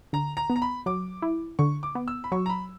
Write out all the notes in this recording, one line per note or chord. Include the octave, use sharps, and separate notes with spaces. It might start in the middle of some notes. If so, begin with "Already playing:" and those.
D3 A#5
A#5
B3
A#5
B5
F#3 D6
E4
D3 C#6
D6
B3
E6
B5
F#3 C#6
A#5
B5